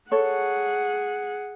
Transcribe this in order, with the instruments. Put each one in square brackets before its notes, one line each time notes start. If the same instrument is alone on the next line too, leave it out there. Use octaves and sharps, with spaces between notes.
[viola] G#4 F#5 [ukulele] A4 C#5